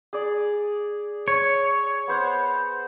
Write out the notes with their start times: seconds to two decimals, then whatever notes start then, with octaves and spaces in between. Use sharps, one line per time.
0.13 G#4 D5
1.28 C#5
2.08 B3 C5 F#5